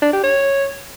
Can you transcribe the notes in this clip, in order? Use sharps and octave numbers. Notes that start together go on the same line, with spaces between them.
D4
G4
C#5